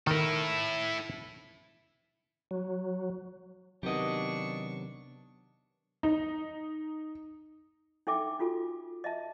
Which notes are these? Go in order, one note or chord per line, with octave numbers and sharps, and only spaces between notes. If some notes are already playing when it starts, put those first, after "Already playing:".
D#3 E4 A4 A#4
F#3
C3 D#3 F#3 B3 D4 G4 D#5 C#6
D#4
D4 D#4 A4 E5 G5 D6
D4 F4 F#4 A4
D#5 E5 A5